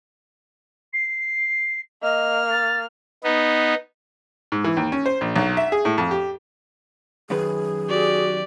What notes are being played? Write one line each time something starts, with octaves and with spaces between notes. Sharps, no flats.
C7
A#3 D#5 F6
A6
B3 D#4
G#2
E3
D#2
C#4
C5
A#1
B1
E5
G#4
A2
F2
G4
F#2 D#3 G#4 B4
F#4 G4 D5